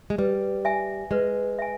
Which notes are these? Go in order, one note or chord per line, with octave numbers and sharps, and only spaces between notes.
G#3
G3 B4
E5 G#5
G#3 B4
E5 G#5